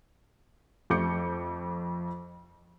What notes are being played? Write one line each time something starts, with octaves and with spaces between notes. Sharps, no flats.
F2 A3 D6 G6 C#7